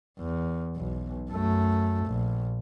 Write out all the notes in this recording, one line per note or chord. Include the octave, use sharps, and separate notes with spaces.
E2
B1
F#2 A3
A#1